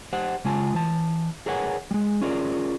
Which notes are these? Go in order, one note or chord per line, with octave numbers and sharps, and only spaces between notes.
G4 C5 F#5
C#3 G#3 F4 G#5 A5
E3 A5
G#4 A#4 B4 C#5 F#5 G#5
G3 G#3
C#4 F4 G#4 A#4 D5